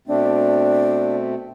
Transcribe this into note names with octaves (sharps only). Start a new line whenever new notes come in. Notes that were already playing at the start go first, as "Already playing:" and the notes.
B2 A3 C4 D4